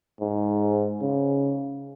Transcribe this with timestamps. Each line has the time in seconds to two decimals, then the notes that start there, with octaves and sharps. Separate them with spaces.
0.21 G#2
1.01 C#3